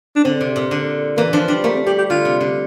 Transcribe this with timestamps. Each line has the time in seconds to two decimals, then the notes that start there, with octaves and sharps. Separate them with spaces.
0.16 D4
0.25 D3 C4
0.41 C3
0.56 A#2
0.71 D3
1.17 E3 A#3
1.33 F3 D4
1.48 G3 D4
1.64 A3 A#3
1.76 C4
1.87 G3 G4
1.98 G4
2.10 D3 F4
2.25 C3
2.41 D3